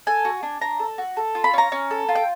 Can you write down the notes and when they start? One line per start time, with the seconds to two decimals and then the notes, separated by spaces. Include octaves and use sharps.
0.07 A4 G#5
0.25 F#4
0.43 D4
0.61 D4 A#5
0.79 A4
0.98 F#4
1.17 A4
1.35 F4
1.44 B5
1.54 C#4 A#5
1.72 C#4
1.91 A4
2.09 F4
2.15 G5